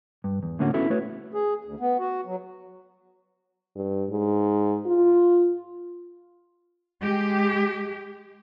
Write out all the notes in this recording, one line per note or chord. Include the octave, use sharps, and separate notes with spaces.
G2
E2
A2 D3 A#3 C#4 F4 F#4
B3 C#4 E4 F#4 A4
A3 F#4 B4 C#5
G#4
D2
B3
F#4
F#3
G2
G#2
F4
G#3 G4